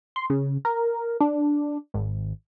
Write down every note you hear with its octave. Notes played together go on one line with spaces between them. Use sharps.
C6
C#3
A#4
D4
G#1